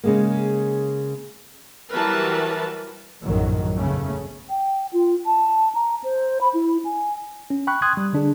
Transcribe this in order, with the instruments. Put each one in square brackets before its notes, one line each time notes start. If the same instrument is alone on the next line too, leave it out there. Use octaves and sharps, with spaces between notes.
[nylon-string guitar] C#3 G#3 A#3
[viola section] E3 F#3 G3 A#4 B4 A5
[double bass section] A#1 F#2 A2 D#3 F#3
E2 C#3 A3 C#4
[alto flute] G5
F4
A5
A#5
C5
B5
E4
G#5
[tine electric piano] C#4
G5 B5 C#6 F#6
C6 D#6 F#6 G#6
G3
D3 D4 G#4